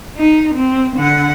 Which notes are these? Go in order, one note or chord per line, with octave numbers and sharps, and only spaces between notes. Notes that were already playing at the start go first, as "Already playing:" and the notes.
D#4
C4
D3 F#5